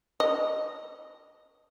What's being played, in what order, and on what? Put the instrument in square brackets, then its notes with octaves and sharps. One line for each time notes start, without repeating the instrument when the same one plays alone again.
[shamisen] D#5